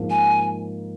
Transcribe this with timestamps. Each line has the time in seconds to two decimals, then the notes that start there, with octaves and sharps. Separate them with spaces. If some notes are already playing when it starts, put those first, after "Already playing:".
Already playing: G#2 F3 A#3
0.10 G#5